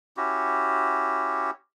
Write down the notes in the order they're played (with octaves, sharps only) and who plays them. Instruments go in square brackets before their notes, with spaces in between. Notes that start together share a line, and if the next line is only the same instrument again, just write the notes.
[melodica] C#4 E4 F#4 G4